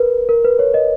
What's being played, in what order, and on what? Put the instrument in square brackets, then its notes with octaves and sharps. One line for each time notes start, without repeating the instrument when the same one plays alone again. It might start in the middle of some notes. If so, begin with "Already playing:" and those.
Already playing: [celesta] A#4 B4
A#4
B4
C#5
D#5